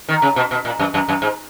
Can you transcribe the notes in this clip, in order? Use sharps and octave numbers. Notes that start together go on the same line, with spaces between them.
D#3
C#3
B2
B2
A#2
F#2
F#2
F#2
G#2